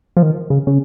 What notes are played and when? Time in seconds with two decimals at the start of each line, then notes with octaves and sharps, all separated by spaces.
0.17 F3
0.23 D#3
0.50 C#3
0.67 C#3